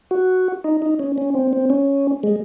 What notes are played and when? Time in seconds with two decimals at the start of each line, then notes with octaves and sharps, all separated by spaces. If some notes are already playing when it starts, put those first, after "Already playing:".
0.11 F#4
0.64 D#4
0.82 D#4
0.99 C#4
1.18 C#4
1.35 C4
1.53 C4
1.70 C#4
2.23 G#3